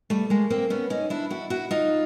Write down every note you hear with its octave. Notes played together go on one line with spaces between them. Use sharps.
G3 A3
G#3 A#3
A#3 C4
B3 C#4
C#4 D#4
D4 E4
E4 F#4
E4 F#4
D#4 F4